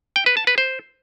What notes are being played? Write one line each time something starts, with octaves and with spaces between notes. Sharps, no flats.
G5
B4
A5
B4
C5